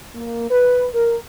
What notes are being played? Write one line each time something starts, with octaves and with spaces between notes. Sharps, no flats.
A#3
B4
A#4